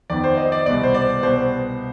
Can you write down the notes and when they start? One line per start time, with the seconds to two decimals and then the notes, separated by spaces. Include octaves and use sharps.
0.10 F2 D#3 B3 D5
0.24 C5
0.37 D#5
0.52 D5
0.66 C2 B2 B3 D5
0.83 C5
0.94 D5
1.22 C2 B2 B3 C5